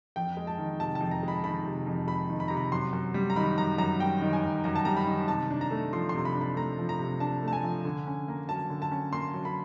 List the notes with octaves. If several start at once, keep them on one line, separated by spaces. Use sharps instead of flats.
F2 G5
G#3
A5
D#3
C3 A5
A5
F2
A#5
G#3
B5
D#3 B5
C3
F2
G#3 B5
D#3
B5
C3 A#5
B5
F#2 C6
F#2
G3
A#5
D#3 B5
F#2 A#5
F#2 A#5
G3 G5
D#3
G#5
F#2
F#2 A#5
A5
G3 A#5
B5
D#3
C3 A5
D4
A#5
A3
F3 C6
C3 C6
B5
D4
B5
A3 A#5
F3
A#5
C3
D4 A5
A3
A5
G#5
F3
D3
C#4
A#3
F#3 A5
D3
A5
C#4
A#3 C6
F#3
B5